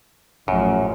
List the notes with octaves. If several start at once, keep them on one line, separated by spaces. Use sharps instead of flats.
A1 F#2 A2 F3